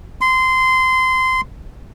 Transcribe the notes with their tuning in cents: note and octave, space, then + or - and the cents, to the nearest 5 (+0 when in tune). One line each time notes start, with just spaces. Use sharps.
C6 -20